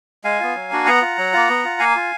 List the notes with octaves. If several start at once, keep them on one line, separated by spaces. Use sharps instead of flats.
G#3 F5 G#5
B3 F4
F#3
A#3 D4 F#4
B3 F#5 A#5
F4
F#3
A#3 F4
B3
F4
A#3 F5 G#5
F4